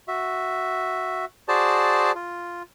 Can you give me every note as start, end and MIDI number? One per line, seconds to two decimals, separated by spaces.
0.08 1.25 66
0.08 1.25 76
1.48 2.12 66
1.48 2.12 68
1.48 2.12 72
1.48 2.12 74
1.48 2.12 81
2.15 2.63 65